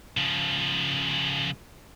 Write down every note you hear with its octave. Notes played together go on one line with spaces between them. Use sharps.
C#3 F3